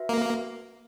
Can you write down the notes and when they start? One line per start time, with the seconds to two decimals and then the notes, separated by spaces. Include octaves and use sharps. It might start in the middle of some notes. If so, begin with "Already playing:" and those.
Already playing: F#4 B4 E5
0.09 A#3